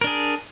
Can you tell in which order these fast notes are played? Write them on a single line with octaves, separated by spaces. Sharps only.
A#4 D4 G#4